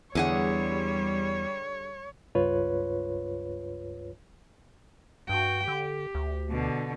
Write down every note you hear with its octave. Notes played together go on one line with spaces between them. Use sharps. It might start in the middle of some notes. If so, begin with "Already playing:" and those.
E2 D3 G3 G#4 C#5 F#5
C#2 G2 F4 B4 C#5
G2 F#4 G5
D3 G4
D2
B2 D3